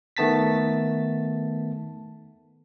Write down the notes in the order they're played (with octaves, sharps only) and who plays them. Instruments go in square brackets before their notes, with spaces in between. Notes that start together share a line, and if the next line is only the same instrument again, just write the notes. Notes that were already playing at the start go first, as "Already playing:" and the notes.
[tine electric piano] D#3 A3 B3 A5 A6 B6